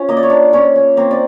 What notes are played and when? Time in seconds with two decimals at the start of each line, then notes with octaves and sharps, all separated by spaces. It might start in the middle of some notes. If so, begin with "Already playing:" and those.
Already playing: C#4 F4
0.09 A#3 D#5
0.17 D5
0.23 C#5
0.30 A#3 D4 D5
0.53 C#4 F4 C#5
0.76 C#4
0.97 A#3 C4 C5
1.11 D5